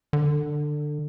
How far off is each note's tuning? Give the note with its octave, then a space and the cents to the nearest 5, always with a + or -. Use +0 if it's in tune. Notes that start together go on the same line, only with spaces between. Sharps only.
D3 +20